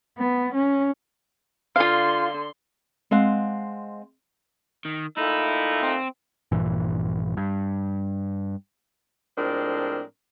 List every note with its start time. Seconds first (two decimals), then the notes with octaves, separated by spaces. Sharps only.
0.18 B3
0.54 C#4
1.76 D3 F4 F5 C6
3.11 G#3 C4 F5 F#5
4.85 D#3
5.17 A#2 A3 D#4 E4
5.82 C4
6.52 A#1 G2 A#2 E3
7.37 G2
9.37 A2 F3 G#3 C4 D4 A#4